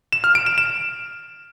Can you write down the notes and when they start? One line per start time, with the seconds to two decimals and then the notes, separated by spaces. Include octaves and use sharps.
0.12 E7
0.24 F6
0.35 D7
0.46 E7
0.58 E7